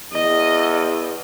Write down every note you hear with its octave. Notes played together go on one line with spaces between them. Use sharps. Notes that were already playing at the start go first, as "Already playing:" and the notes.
E2 D#5